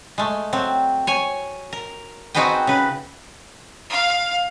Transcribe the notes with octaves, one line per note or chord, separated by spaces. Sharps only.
G#3 A3
F#3 C4
C#5 G#5
A#4
C4 D#4 F#4 G#4 B4 G5
C#3 B4
F5